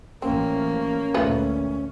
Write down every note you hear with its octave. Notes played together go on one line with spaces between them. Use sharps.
A1 F3 A#3 C4 C#4
D2 A#2 G#3 A3 F4 B4